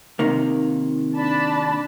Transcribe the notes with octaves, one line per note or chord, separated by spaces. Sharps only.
C3 D#3 A#3
D4 A5 B5